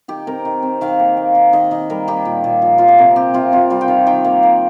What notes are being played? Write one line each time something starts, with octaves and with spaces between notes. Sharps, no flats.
D#3 G4
C4 A#4
D#3
C4
D#3 F5
A#3
A#3
D#3
D#3 D#5
D#3 D#5
G3 A#4
D#3 G4
A#2
A#2
F3
F3 F4
G4
C3 A#4
C4 G4
C3 F4
C3 F4
G3 F4
G5
D#3 F5
D#3 G5
A#3 F5
A#3